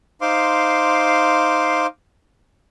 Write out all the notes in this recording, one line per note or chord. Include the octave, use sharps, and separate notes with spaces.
D#4 C5 F5 C6 D6